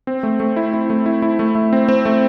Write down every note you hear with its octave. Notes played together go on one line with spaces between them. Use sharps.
C4
A3
A3
E4
E4
A3
E4
E4
A3
A3
C4
C4
A3